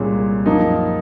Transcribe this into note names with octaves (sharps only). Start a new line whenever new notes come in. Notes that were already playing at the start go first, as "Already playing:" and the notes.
Already playing: C2 A#2 G#3 C#4
F#2 F3 A#3 D#4